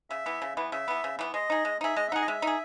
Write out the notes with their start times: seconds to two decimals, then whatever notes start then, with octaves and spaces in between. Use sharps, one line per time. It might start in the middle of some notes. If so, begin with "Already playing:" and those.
0.10 C#3 E5
0.26 E3 B3
0.42 C#3
0.57 E3 B3
0.72 C#3 E5
0.88 E3 B3
1.04 C#3
1.19 E3 B3
1.34 G#3 D#5
1.50 D#4 G#4
1.65 G#3
1.81 D#4 G#4 E5
1.96 G#3 D#5
2.08 E5
2.12 D#4 G#4 F#5
2.21 D#5
2.28 G#3 E5
2.42 D#4 G#4